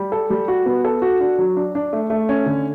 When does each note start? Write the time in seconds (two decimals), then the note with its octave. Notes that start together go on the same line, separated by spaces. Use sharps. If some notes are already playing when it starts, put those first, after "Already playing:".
Already playing: G3
0.12 A4
0.30 G3
0.48 F#4
0.66 B3
0.85 A4
1.02 F#4
1.20 D4
1.39 F#3
1.57 D4
1.75 D4
1.93 A3
2.10 A3
2.29 C#4
2.46 D3